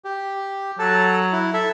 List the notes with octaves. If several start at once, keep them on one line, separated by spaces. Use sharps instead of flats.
G4
F#3 A4 A5
E4
A4 E5